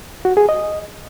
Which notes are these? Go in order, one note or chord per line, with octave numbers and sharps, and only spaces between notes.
F#4
G#4
D#5